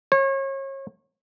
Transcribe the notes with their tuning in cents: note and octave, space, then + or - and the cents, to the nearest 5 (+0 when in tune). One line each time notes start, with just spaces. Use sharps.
C#5 -35